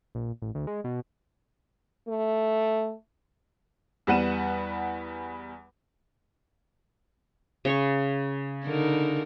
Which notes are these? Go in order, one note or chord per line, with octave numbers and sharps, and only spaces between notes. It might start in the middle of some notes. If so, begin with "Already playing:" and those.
A#1
A1
D2
G#3
B2
A3
E2 G3 B3 F#5 D#7 E7
C#3 C#5 C#6
D3 D#4 A#4